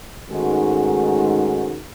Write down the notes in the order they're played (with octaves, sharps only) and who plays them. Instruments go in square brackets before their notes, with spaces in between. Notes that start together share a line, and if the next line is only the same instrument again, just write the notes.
[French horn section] G#2 D#3 G#3 A3 C#4 F#4